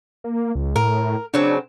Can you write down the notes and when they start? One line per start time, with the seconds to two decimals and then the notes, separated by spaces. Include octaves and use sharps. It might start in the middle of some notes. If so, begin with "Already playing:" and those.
0.24 A#3
0.55 C#2
0.76 A2 A#4
1.34 C#3 F#3 C4 D4